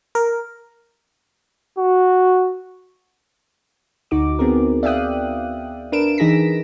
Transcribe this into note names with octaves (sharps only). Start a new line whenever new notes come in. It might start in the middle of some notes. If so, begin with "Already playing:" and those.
A#4
F#4
D2 D#4 F#4 D6
B3 C4 G#4 A#4
D5 E5 F5 G5 D#6 F#6
D4 A#4 B4 D7 E7
E3 D#4 G#4 A#6 B6